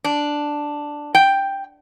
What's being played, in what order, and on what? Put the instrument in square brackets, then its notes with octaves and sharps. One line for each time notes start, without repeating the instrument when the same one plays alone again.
[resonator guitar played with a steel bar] D4
G5